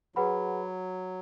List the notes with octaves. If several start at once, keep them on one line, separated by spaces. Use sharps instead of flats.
F#3 G#4 B4 F#5 B5